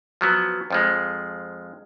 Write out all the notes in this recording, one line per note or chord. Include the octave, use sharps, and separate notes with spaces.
F3 F#3 B3
F2 F3 G#3